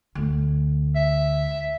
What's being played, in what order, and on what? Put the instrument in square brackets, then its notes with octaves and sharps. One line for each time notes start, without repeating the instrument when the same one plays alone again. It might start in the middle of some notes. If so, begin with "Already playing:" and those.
[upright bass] D2
[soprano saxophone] E5